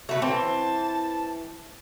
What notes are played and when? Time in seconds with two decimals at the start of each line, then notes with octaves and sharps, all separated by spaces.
0.09 A3 F#4 B4
0.22 E3 C4 A5